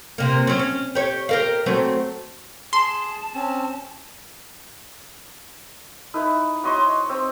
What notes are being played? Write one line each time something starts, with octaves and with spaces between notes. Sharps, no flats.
C3 A#3
F#3 C#4
C#4
G4 C#5
G4 A#4 F5
F#3 A3 C4
G#4 A5 C6
C4 C#4
D#4 E4 B4
F#4 C#5 D#5 C6
C4 E6